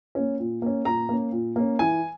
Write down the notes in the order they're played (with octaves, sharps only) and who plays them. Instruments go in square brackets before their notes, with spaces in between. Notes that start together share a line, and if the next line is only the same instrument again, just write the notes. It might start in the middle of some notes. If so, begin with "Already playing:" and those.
[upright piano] A#3 C#4
A#2
A#3 C#4
A#2 A#5
A#3 C#4
A#2
A#3 C#4
E3 G#5